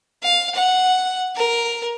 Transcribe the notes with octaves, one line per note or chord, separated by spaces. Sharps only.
F5
F#5
A#4